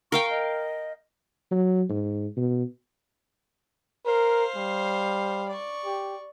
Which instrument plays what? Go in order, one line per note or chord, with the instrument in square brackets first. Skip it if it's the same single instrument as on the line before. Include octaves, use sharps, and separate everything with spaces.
[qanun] A#4 F5 G5 [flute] C#6
[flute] D#5
[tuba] F#3
G#2
B2
[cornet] A#4 [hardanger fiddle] C5 F5
[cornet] G3
[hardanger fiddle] D5 C#6
[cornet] G4